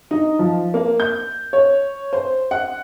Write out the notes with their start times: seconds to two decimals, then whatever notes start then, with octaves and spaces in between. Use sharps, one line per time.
0.11 D#4
0.39 F3
0.74 A#3
1.00 G6
1.53 C#5
2.13 C5
2.51 F#5